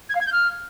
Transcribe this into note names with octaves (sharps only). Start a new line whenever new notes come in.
G#6
F5
G#6
G6
F6